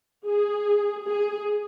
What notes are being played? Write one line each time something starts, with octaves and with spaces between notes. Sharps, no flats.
G#4
G#4